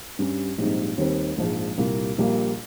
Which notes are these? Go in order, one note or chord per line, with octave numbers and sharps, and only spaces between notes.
G2 G3 C#4
A#1 G#2 G3 C4 D#4
D#2 D#3 G3 C4 D#4
A#1 G#2 F3 G#3 D#4
C2 A#2 G3 A#3
A#1 A#2 G3 A#3